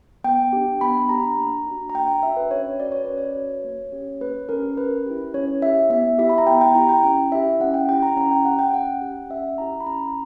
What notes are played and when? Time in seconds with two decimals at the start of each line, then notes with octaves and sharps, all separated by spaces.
0.24 B3 G5
0.53 D4 G4
0.81 B3 B5
1.09 D4 G4 A#5
1.38 A#3
1.67 D4 F#4
1.90 A#5
1.94 A#3 G5
2.08 G5
2.22 D4 F#4 E5
2.37 B4
2.51 C#4 C#5
2.79 F#4 D5
2.92 C#5
3.04 C#4 B4
3.18 C#5
3.36 F#4
3.64 A#3
3.92 C#4 G4
4.21 A#3 B4
4.49 C#4 G4 A#4
4.77 C#4 B4
5.06 E4 G4
5.34 C#4 C#5
5.62 E4 G4 E5
5.90 B3 E5
6.19 E4 G4 E5
6.29 B5
6.38 A#5
6.47 B3 G5
6.61 G5
6.75 E4 G4 A#5
6.89 G5
7.03 C#4 G5
7.32 E4 G4 E5
7.60 C#4 F#5
7.74 G5
7.89 E4 G4 G5
8.03 A#5
8.16 C#4 A#5
8.31 G5
8.45 G4 F#5
8.59 G5
8.74 C#4 F#5
9.01 G4
9.30 C#4 E5
9.58 E4 G4 A#5
9.80 B5
9.86 C#4 A#5